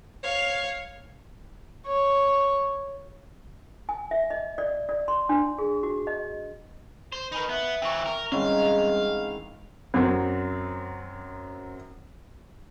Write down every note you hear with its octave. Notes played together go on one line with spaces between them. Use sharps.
C#5 F5
C#5
G#5
E5
D#5
D5
D5
C6
D4
G#4
F#4
D#5
C5
D#4 A#4 B4 G#5 B5
B3 E5
E3 C4 G5 C#6
A#4
G#2 D#3 E3 G3 C4 C#4 F5
F#2 F#3 C4